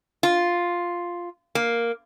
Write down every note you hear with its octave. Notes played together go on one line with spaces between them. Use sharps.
F4
A#3